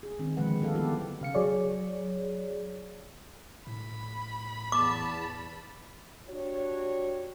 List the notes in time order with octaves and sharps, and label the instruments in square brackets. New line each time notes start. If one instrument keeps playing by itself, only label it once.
[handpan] G#4
D#3 C4 D#4
D3 D#3 F3 G#3 B4 F#5
F#3 A#3 G4 A4 F5
G3 B3 E4 G4 A4
[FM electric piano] C#3 F5 C#7
F#3 G#4 C#5 D5
[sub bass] A2 [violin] B5
[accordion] E2 A5 [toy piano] D6
[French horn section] D4 F#4 G4 C#5